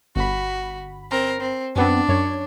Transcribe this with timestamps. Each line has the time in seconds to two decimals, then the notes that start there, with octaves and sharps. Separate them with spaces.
0.16 G1 F#4 B5
1.11 C4 A#4
1.41 C4
1.76 F#2 B3 C4 D4
2.09 F#2 C#5